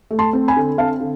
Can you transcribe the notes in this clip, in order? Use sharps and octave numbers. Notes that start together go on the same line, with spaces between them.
A3
A5 C6
C4
G#5 B5
D3
C4 F5 A5
D3